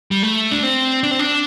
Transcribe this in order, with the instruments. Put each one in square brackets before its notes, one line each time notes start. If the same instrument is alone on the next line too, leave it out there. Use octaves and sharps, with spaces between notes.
[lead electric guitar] G3
A3
D4
C4
D4
C4
D4